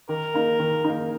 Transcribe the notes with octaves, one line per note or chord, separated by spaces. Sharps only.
D#3 A#4
A#3 D#4
D#3
A#3 D#4